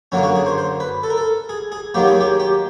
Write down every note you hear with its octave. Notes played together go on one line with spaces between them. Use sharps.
F#2 D3 F#3 A#3 C#4
F#4
G#4
C5
C5
B4
A4
A#4
A4
G#4
G#4
D#2 D#3 F#3 A#3 G4
G#4
G4
G4